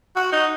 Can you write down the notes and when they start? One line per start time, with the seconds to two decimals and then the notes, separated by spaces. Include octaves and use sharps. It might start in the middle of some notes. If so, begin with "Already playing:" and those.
0.16 F#4
0.32 D#4